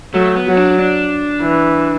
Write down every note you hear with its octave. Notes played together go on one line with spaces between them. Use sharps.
F#3 A3
B3
F#3
D4
D4
E3